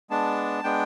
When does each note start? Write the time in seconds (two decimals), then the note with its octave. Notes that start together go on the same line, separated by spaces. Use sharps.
0.10 G#3 B3 D4 A5
0.64 G#3 B3 D4 G5